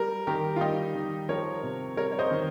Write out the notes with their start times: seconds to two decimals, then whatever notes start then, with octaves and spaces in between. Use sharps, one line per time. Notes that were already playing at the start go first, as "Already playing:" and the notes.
Already playing: G3 A#4
0.27 D#3 G4 A#4
0.56 F4
0.61 G3 D#4 G4
0.95 D#3
1.29 F3 A#4 C#5
1.63 C3
1.97 G3 A#4 C#5
2.12 C#5
2.19 C5 D#5
2.31 D#3